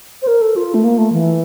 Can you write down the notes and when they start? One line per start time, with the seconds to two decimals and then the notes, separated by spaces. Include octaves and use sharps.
0.22 C5
0.27 A#4
0.41 A4
0.56 F4
0.74 A3
0.84 A#3
0.98 A3
1.13 E3